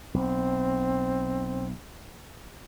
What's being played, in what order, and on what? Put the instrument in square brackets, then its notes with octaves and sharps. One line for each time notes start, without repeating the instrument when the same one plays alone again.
[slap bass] B1 [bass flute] C4